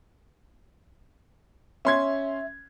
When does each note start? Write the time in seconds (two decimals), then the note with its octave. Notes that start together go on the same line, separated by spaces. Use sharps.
1.85 C#4 E5 C6 G#6